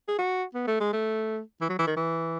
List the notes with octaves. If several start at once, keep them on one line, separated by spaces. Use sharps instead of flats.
G#4
F#4
B3
A3
G#3
A3
E3
F#3
E3
D#3
E3